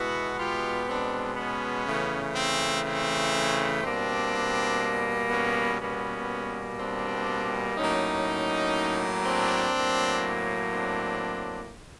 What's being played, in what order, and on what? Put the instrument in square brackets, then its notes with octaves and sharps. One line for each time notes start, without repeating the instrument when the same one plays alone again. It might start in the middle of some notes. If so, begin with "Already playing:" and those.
Already playing: [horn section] B2 G#3 B3 E4 F#4
F4 G4
C4 D4
B3 C#4
C#3 E3 A3
C4
C4
B2 G3 A#3 C4 D4
B3 C#4
B2 G3 A#3 B3 C#4
C4 D4
A2 F#3 A#3 C#4 D#4
C4 D4
A2 F#3 A#3
C4 D4